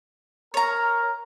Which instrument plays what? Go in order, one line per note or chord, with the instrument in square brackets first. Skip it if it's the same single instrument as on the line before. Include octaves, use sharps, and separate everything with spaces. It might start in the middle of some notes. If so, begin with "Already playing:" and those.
[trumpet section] A#4 [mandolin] C#5 A#5